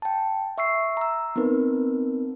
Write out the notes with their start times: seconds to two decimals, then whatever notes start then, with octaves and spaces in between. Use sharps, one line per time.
0.02 G5 A5
0.58 E5 C#6 E6 C7
0.97 A#5 E6
1.36 B3 C4 D#4 A#4 B4